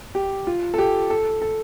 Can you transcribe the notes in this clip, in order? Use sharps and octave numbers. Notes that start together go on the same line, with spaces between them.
G4
F4
A4
G4
A4
A4